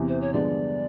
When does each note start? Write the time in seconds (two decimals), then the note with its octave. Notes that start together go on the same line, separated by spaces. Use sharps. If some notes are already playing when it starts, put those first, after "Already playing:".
Already playing: E2 C3 E3
0.08 C5
0.21 C#5
0.33 G2 D3 F3 G#3 B3 D5